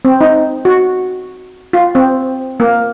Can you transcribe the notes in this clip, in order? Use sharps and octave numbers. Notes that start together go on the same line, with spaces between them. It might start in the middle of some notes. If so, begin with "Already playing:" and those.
C4
D#4
F#4
F4
C4
A#3